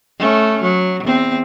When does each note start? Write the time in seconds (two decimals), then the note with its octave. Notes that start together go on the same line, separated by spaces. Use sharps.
0.19 A3 C#4
0.63 F#3
1.04 E2 C4